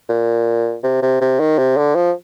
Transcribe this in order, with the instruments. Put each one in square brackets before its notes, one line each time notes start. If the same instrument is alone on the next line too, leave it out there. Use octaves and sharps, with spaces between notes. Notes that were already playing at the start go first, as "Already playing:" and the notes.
[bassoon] A#2
C3
C3
C3
D#3
C3
D3
F3